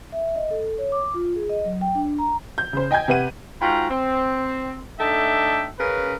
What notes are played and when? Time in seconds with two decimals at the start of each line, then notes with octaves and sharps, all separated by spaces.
0.12 E5
0.36 D#5
0.51 A4
0.78 C#5
0.92 D6
1.14 F4
1.36 G#4
1.49 D#5
1.65 F#3
1.81 G5
1.95 D4
2.18 A#5
2.58 G6
2.73 C#3 C5
2.91 D#5 G5 G#5 G6 G#6
3.08 C3 B4 F#5 D#7
3.60 G#2 F4 F#4 G5 A#5 B5
3.90 C4
4.99 A3 D4 D#4 A4 E5 G5
5.78 C#3 C#4 A#4 B4